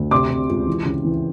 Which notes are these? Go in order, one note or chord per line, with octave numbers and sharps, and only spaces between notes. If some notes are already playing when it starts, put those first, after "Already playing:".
Already playing: D2
C3 C6 D6
C3
C#2
E3
C#3
E3